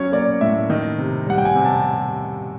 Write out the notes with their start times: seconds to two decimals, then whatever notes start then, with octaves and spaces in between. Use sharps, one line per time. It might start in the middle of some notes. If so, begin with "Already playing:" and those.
Already playing: F#3 C#4 C#5
0.12 A#3 D5
0.41 A2 E5
0.70 D#3 D#5
0.98 C3
1.27 G3 F#5
1.38 G5
1.45 G#5
1.55 C3
1.65 A5